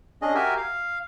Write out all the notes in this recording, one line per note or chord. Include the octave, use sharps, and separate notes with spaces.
C#4 D4 G#4 D#5
F#4 G4 A#4 E5 G#5
F5